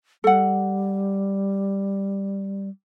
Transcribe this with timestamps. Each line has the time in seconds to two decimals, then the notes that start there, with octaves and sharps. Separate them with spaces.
0.24 G3 A4 F#5